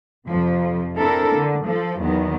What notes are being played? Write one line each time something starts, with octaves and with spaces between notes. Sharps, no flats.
F2 C3 F3
C4 D4 E4 A4 A#4
D3
F3 A4
E2 D#3 F#3 B3